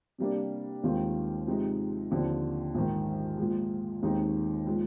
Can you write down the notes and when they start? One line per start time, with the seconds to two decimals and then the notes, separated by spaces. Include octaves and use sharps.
0.18 C3 G3 A#3 D4
0.84 D#2 D#3 G#3 C4 F4
1.47 C3 F3 G#3 D#4
2.11 D#2 D3 F3 C4
2.75 A#1 G#2 D#3
3.38 A#2 F3 G#3
4.03 D#2 D#3 G#3 C4 D#4
4.67 A#2 F3 G#3